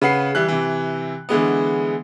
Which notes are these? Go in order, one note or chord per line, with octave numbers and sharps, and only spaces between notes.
C#3 B4 F#5 C7
E3 G3 F#6
C3 E3
D3 E3 G#3 B3